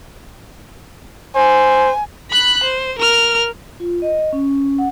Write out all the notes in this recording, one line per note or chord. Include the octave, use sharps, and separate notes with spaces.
C5 G#5
B5 F#6
C5
A#4 F6
F4
D#5
C#4
F#5